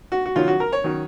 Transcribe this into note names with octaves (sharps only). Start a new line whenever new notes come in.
F#4
F#4
D#3 F#3 C#4 F4
F#4
A#4
C#5
D#3 F#3 C#4